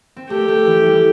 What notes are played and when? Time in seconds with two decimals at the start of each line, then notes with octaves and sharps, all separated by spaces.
0.16 C4
0.30 A3 G4
0.48 A3
0.67 E3
0.86 G3